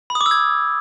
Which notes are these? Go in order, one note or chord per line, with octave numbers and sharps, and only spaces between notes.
B5
D#6
D6
E6
G#6